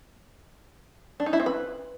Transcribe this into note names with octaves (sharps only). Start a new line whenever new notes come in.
D4
D#4
E4
C4
B4